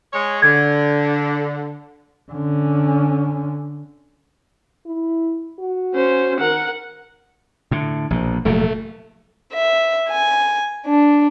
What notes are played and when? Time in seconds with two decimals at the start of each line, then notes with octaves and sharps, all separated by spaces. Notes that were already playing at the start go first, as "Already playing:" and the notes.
0.13 G#3 C#5
0.42 D3 G#6
2.32 D3 C#4
4.86 E4
5.59 F#4
5.94 C#4 C5
6.40 D#3 A#4 F#5
7.71 A2 D3
8.10 A#1 B2
8.45 F1 A#2 F#3 A3
9.52 E5
10.09 G#5
10.87 D4